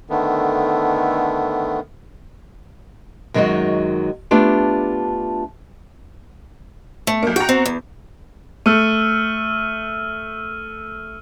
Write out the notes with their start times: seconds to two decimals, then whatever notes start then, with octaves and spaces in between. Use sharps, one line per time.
0.10 D3 D#3 A3 B3
3.34 F#2 D#3 F#3 G#3 D#4 F#4
4.31 A3 B3 D4 F4 G4
7.07 A3
7.23 B1 A#3
7.36 F#4 G5 A#5
7.49 C4
7.66 E2
8.66 A3 E6 F6 D#7